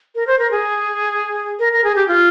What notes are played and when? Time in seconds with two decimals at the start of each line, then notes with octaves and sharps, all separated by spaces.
0.15 A#4
0.27 C5
0.39 A#4
0.51 G#4
1.59 A#4
1.73 A#4
1.84 G#4
1.96 G4
2.08 F4